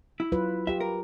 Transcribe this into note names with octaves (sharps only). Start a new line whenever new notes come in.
E4
F#3 F4 B4
F4 G4 E5
A#4